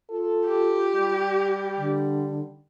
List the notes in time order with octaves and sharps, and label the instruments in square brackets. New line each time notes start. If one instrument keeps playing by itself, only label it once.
[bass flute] F4 [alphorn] A4
[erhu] G4
[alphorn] G3
[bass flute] D3